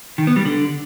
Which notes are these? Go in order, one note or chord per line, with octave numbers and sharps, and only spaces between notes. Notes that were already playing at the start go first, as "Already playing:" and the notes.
D#3
B3
G3
D3